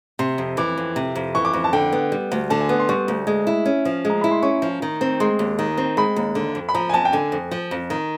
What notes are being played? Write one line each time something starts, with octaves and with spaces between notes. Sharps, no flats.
C3 C6
F2
E3 D6
F2
C3
F2
E3 C#6
D6
F2
A5
D3 G5
B3
G3
D2
D3 A5
G#5
B3
C6
G3 C#6
D2
G#3
E4
C#4
F3
G#3
A#5
E4 B5
C6
C#4 C#6
F3
D#3
C4
G#3 C6
D#2
D#3
C4
G#3 B5
D#2
D3
F2
B5
F3 A#5
G#5
F2 A5
G5
D3 G#5
F2
F3
F2
D#3